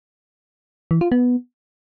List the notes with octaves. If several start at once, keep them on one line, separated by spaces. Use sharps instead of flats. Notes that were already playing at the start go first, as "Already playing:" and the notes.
E3
F4
B3